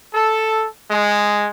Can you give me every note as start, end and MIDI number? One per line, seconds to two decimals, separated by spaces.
0.14 0.67 69
0.91 1.49 56